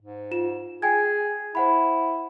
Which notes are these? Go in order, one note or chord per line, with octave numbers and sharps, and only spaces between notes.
G#2
F4 E7
G#4 G5 G#5 G#6
E4 C5 F#5 B5